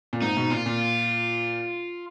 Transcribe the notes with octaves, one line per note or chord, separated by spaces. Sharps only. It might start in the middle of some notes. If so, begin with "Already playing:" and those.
A#2
G#2 D#4
G#2 B2
A#2 F4
A#2